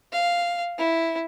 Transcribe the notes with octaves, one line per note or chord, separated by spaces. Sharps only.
F5
E4